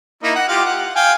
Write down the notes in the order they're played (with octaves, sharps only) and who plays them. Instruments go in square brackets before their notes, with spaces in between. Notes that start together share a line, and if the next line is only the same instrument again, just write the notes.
[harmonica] A#3 D#4 E4
F#5
F4 G4 F5
F#5
F5 G5 G#5